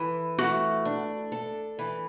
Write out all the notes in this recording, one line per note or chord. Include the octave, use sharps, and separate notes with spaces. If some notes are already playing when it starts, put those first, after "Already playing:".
Already playing: E3 A4
A3 F#4
D4
A4
E3